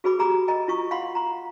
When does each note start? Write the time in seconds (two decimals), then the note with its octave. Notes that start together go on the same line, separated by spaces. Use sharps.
0.04 F#4 G#4 B4 B5 D6
0.19 G4 G#4 A#5 B5 D6 D#6
0.48 A#4 D#5 G5 A#5
0.68 E4 F4 C#6 D#6
0.91 F5 F#5 B5 C6
1.15 A#5 C6